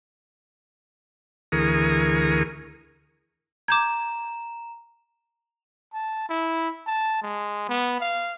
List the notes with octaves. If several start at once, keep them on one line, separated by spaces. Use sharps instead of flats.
D2 E3 G#4 A#4 C#6 D#6
A#5 D6 G6 G#6 E7
A5
E4
A5
G#3
B3
F5